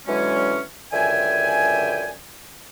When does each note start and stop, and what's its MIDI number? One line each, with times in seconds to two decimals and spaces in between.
0.06 0.59 50
0.06 0.59 52
0.06 0.59 54
0.06 0.59 56
0.06 0.59 61
0.92 2.12 37
0.92 2.12 42
0.92 2.12 50
0.92 2.12 76
0.92 2.12 79
0.92 2.12 80